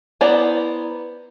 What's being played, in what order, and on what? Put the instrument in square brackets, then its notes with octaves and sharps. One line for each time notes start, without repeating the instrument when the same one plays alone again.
[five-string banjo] B3 E4 C5 D5 A#5